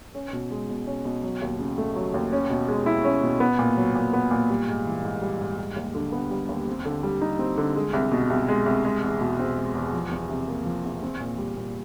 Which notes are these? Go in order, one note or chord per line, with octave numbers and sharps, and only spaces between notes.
C#4
B2
G#3
B2
C#4
B2
F#3
D#2
C#3
A3
F#3
D#2
C#4
B2
G#3
E4
C#4
B2
B3
A#2
F#3
A#2
B3
A#2
G3
G#2
E3
G#2
G3
G#2
G3
D#2
D3
B3
G3
D#2
C4
D3
G3
D#4
C4
D3
G#3
C2
B2
C2
G#3
C2
G#3
E2
B2
C4
G#3
E2
F3
E2
C3
A#3
F3
E2
C4
A#2
G3
A#2